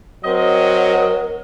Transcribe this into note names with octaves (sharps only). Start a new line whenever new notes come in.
F#3 C4 A#4 D#5